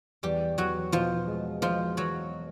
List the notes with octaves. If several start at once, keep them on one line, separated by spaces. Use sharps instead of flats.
E2 G3 G4
E2 F#3 F#4
B2 F3 F4
G#3
F3 G#3 F4
E2 F#3 F#4